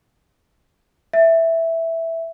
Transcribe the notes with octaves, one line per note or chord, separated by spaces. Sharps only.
E5